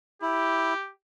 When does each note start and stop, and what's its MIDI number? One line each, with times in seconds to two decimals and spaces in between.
0.22 0.74 64
0.22 0.91 67